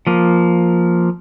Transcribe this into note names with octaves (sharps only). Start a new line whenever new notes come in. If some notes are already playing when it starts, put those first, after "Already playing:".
F3 A#3